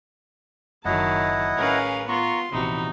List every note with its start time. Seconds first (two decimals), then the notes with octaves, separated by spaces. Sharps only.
0.85 F#1 D#3 F#3 E4 D#5 F#5 A5
1.57 A1 C#4 G#4 A#4 B4 F5
2.09 B3 F4 A#5 C6 C#6
2.53 A#1 E2 C3 D#4 F#4 B5